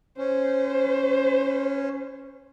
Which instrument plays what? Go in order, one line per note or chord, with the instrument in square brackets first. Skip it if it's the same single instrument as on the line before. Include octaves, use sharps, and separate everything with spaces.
[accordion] C#4 [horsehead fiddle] C5